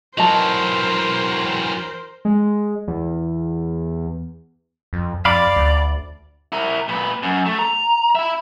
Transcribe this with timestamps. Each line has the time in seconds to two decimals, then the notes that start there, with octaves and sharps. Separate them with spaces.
0.18 E3 F#3 A#4 C5 D#5 A5
2.25 G#3
2.88 E2
4.93 F2
5.25 F2 D5 F5 B5 D6
5.56 D2
6.52 E4 A#4
6.89 A#2 B4
7.23 F#2
7.46 A3
7.59 A#5
8.15 E5 B5